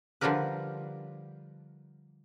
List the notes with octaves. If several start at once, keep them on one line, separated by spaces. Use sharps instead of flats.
D3 F3 G3 G4 A#4 B4